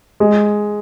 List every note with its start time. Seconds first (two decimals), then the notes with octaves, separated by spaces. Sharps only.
0.20 G#3